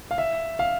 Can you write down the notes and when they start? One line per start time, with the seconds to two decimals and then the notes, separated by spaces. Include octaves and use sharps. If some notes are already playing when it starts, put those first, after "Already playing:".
0.11 F5
0.18 E5
0.59 F5